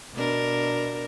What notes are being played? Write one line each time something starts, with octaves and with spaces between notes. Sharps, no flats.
B2 D4 A#4